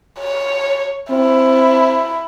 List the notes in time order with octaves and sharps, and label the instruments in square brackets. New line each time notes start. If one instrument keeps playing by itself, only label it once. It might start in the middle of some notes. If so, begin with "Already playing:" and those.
[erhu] C#5
[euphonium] C4 [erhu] E4